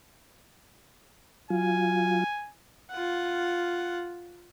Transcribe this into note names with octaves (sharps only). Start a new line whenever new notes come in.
F#3 F4 G#5
F4 F#5